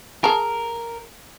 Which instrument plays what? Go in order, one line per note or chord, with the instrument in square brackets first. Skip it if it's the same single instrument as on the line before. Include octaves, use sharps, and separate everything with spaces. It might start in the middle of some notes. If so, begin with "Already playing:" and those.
[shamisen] G#4 A5 [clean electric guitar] A#4